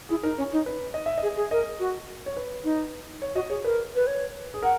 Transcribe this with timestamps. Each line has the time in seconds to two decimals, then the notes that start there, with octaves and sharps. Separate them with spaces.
0.09 E4 G#4
0.23 D#4 A#4
0.38 C#4 C#5
0.52 D#4
0.66 B4
0.94 D#5
1.06 E5
1.18 D#5
1.23 G#4
1.36 G#4
1.51 A#4 D#5
1.80 F#4
2.26 C#5
2.37 B4
2.64 D#4
3.22 C#5
3.35 F#4 D#5
3.49 G#4 C#5
3.64 A#4 B4
3.95 B4
4.07 C#5
4.54 G#4
4.63 A#4 F#5